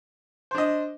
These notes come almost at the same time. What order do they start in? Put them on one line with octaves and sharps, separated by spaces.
C5 D4 D#5